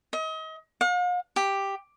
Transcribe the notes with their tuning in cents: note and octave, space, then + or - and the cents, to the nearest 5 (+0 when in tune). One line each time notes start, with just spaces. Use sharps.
D#5 +35
F5 +45
G4 +5